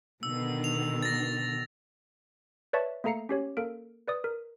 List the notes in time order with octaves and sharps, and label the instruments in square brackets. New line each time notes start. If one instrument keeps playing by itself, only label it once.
[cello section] B2 D3 D#3 [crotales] E6
[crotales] F7
A6 A#6
[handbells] B4 C#5 D5 E5 A5 C#6
A3 A#3 A4 A#5 C7 C#7
C#4 G4 C#5
A#3 A4 A#4 D7
B4 D5 D#6
A#4